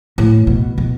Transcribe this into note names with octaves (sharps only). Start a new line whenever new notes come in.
A2
B2
B2